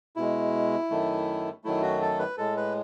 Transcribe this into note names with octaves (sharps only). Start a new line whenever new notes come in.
B2 G#3 E4
F#2 D#3 A3
F#2 D#3 F#3 A3 E4
F#4
A4
B4
A2 G#3 A4
B4